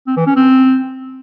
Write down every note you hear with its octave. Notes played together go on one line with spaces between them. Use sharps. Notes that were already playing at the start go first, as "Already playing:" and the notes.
C4
E3
C#4
C4